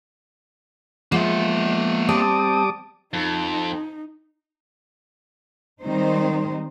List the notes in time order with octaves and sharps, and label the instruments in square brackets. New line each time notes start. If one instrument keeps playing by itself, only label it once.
[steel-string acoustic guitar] F3 G#3 B3 [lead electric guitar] A#3 E5
[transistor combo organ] G3 D6 D#6 [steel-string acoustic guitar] C4 [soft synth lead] A5
[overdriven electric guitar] F2 [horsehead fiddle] D#4
[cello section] D#3 G3 G#3 C4 D#4 C5